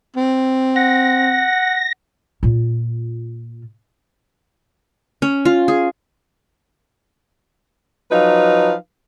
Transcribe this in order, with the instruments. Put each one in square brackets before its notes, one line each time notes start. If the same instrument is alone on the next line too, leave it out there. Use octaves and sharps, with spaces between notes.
[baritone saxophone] C4
[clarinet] F#5 [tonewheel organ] A#6
[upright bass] A#2 F4
[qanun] C#4
F4
G#4
[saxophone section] F3 F#3 D#4 B4 F5